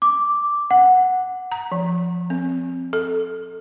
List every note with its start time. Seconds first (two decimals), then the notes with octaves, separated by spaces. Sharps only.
0.02 D6
0.71 F#5
1.52 A#5
1.72 F3
2.30 C4
2.93 A4